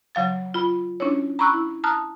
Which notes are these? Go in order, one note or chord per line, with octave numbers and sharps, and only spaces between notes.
C#3 F#3 F5 A6
F4 B5
C#4 D4 E4 C#5
A#5 B5 C#6 E6 F#6
E4
A5 A#5 D#6 F6 F#6